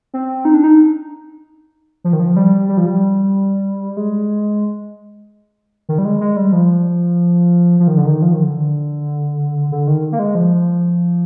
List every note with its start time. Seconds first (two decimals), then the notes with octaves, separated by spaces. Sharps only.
0.14 C4
0.45 D#4
0.54 D4
0.64 D#4
2.04 F3
2.13 D#3
2.20 F3
2.36 G3
2.69 G3
2.77 F3
2.86 G3
3.97 G#3
5.89 D#3
5.98 G3
6.05 G#3
6.21 G#3
6.37 G3
6.53 F3
7.80 F3
7.88 D#3
7.97 D3
8.05 D#3
8.22 F3
8.33 D#3
8.43 D3
9.72 D3
9.87 D#3
10.12 A#3
10.19 G#3
10.35 F3